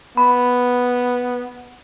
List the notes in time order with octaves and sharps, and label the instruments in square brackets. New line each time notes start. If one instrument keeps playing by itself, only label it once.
[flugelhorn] B3 [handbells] B5